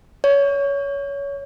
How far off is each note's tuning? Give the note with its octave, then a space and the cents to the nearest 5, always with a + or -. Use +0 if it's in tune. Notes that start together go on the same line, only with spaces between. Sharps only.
C#5 +20